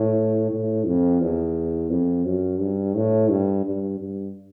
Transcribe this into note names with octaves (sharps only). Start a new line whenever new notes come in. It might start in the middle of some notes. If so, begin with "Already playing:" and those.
Already playing: A2
A2
F2
E2
F2
F#2
G2
A2
G2
G2
G2